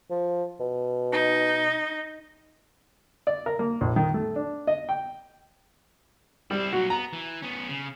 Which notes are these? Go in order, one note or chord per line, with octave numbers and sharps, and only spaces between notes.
F3
B2
D#4
D5
A#4
A#3
A#1
D#3
A3
D4
D#5
G5
G3 C4 E4
A#2 F#3 F#4
B3 A#5
E3
B3 C#4
C#3